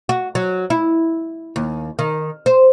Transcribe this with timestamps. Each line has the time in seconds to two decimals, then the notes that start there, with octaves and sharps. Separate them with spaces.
0.09 F#4
0.35 F#3
0.70 E4
1.56 D#2
1.99 D#3
2.46 C5